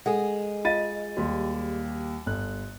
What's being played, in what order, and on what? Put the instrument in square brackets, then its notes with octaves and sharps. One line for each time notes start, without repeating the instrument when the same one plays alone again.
[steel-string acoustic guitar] G#3 G#4 [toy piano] A4 F#5
[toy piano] F4 D#5 F5 [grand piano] A6 D#7
[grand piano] D#2 G3 [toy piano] F#4 C6
[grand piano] G1 F#6